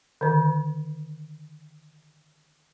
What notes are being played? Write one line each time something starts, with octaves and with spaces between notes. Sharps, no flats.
D3 D#3